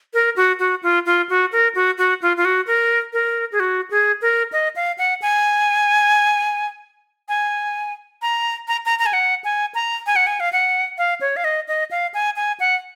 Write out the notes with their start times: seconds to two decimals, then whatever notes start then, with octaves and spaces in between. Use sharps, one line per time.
0.14 A#4
0.36 F#4
0.59 F#4
0.83 F4
1.06 F4
1.29 F#4
1.52 A#4
1.75 F#4
1.98 F#4
2.22 F4
2.37 F4
2.45 F#4
2.67 A#4
3.13 A#4
3.52 G#4
3.60 F#4
3.91 G#4
4.22 A#4
4.52 D#5
4.76 F5
4.98 F#5
5.22 G#5
7.29 G#5
8.22 A#5
8.68 A#5
8.86 A#5
8.99 A#5
9.06 G#5
9.13 F#5
9.44 G#5
9.75 A#5
10.07 G#5
10.16 F#5
10.27 G#5
10.40 F5
10.53 F#5
10.98 F5
11.21 C#5
11.37 F5
11.44 D#5
11.68 D#5
11.91 F5
12.14 G#5
12.36 G#5
12.60 F#5